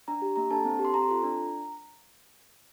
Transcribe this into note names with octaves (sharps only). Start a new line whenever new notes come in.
D4 A#5
G4
A#3 A#5
D4 A4 A5
C4
G4
C6
C4 A#5
F4 A4
D4